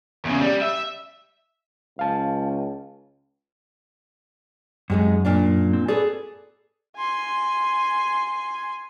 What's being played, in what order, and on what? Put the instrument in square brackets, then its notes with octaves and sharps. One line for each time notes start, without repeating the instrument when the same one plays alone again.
[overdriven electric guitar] E2 C#3
G3
E5
[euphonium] C#2 [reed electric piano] F5 A5
[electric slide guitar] F#2 [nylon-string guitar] C3 G#3 D#4
[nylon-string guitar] A#2 A#3 D4
[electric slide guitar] C4
[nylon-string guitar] G#4 A4 B4 [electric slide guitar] D5
[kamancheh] G#5 C6